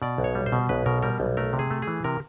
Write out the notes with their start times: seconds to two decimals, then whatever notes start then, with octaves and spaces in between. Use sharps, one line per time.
0.02 B2 D5
0.18 B1
0.24 C#5
0.35 G3
0.46 C5
0.52 B2
0.69 B1 B4
0.86 B2 A#4
1.03 G3 A#4
1.20 B1
1.37 A3 A#4
1.53 C3
1.59 G#4
1.70 A3
1.82 G#4
1.88 E3
2.04 C3 A#4